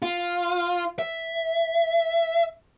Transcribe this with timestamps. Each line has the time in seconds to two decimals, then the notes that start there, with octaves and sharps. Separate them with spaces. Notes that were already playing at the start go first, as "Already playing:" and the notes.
0.02 F4
0.99 E5